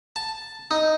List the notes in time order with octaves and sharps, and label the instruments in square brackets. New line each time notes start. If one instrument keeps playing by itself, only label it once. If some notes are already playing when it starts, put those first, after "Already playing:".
[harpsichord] A5
D#4